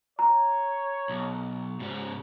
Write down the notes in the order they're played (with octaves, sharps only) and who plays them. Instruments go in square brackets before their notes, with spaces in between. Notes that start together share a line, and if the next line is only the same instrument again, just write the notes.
[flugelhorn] C#5 [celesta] A#5
[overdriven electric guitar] B1
G#2 C#3